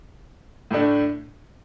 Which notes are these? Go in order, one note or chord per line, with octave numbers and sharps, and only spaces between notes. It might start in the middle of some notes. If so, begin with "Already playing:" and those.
A2 A3 D4